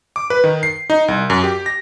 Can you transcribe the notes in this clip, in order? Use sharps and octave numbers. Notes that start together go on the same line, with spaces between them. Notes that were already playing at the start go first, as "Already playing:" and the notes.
D6
B4
D#3
C7
D#4
C2
F#2
G4
A#6